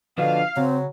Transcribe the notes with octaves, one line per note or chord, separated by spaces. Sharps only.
B2 D3 F3 D4 F4 F5
C#3 F#3 C4